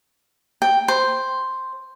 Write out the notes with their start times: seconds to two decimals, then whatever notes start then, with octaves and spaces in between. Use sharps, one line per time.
0.62 G5
0.88 C5